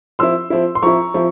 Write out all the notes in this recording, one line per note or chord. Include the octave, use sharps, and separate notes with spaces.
F3 C4 E4 C6 E6
F3 C4 E4
C6
F3 C4 E4 A#5 C#6
F3 C4 E4